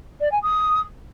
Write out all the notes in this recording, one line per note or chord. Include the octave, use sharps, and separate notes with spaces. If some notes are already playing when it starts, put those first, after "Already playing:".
D5
G#5
D#6